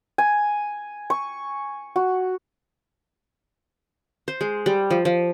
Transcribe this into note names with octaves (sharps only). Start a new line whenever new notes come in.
G#5
C#6
F#4
C5
G#3
G3
F3
F3